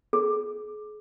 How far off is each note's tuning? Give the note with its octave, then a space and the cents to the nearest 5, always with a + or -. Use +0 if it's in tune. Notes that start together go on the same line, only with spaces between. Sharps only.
G#4 +35